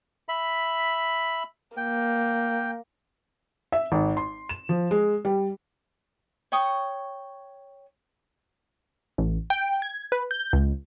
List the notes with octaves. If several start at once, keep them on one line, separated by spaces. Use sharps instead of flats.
E5 B5
A#3 G5
E5
G#1
C6
E7
F3
G#3
G3
C#5 G5 C#6 D#6
A1
G5
G#6
B4
G6
C#2